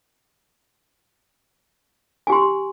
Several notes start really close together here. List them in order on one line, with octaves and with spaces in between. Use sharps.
G#5 G4 C6